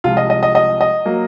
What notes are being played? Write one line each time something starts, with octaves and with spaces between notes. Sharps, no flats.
C2 C3 F3 G#3 F4
D#5
D#5
D#5
D#5
D#5
F#3 A#3